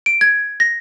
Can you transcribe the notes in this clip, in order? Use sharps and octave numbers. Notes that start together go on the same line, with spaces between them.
D7
G#6
A#6